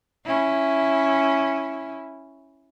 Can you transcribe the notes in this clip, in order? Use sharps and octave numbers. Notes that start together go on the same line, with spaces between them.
C#4 E4